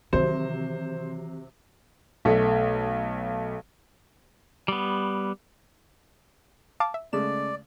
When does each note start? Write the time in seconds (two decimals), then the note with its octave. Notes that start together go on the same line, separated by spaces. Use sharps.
0.13 C3 D#3 E3 F#3 C5
2.25 B1 A3
4.68 G3 B3
6.80 F5 A5 D6
6.94 E5
7.13 C#3 G#3 A3 D5 E7